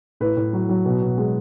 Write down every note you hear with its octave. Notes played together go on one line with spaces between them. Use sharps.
A2 B4
A2
F#3
F#3
B2
B2
G#3